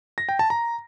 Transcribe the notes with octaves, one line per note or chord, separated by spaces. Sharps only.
A#6
G5
A5
A#5